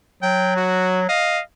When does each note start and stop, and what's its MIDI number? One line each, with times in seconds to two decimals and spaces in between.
0.22 1.06 54
0.22 0.52 79
0.56 1.01 66
1.09 1.40 75
1.09 1.41 77